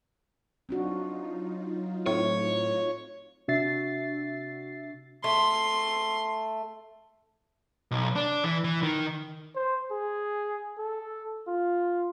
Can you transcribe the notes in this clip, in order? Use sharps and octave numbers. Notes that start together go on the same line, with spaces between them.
F#3 C4 D4 D#4 F4 F#4
A2 C4 C#5
C3 D4 F#4 E5 A6 C7
A3 C6
B1
D4
E3
E3
D#3
C5
G#4
A4
F4